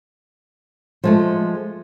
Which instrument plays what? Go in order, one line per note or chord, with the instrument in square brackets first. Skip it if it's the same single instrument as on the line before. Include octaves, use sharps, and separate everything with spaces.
[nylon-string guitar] F3 G#3 A3